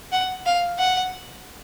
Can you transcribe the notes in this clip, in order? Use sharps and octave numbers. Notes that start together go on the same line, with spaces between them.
F#5
F5
F#5